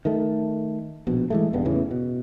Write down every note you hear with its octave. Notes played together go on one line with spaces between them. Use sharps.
D#3 A3
A#1 B2
E3 G#3 A3
D#1 E2 G2 B3
E2 A2 C#3 E3
B2